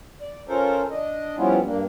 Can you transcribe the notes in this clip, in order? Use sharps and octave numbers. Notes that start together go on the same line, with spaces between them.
D5
C#4 F4 A4 A#4 C5
D4 D#5
F3 G3 B3 C#4 E4 F4
G2 A#3 D4